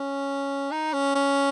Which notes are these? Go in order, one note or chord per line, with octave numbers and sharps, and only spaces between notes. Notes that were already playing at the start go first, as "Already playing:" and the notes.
Already playing: C#4
D#4
C#4
C#4